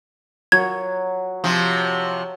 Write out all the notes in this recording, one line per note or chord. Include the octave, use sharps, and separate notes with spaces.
F#3 G#6
C3 F3